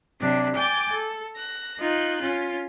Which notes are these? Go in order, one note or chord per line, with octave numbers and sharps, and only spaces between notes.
C3 F#3 D4
G5 G#5 D6 G6 A6
A4
F#6 A#6
D#4 F4 F#6 G6
C#4 F4